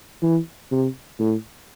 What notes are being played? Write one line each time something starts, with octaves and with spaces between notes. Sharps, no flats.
E3
C3
A2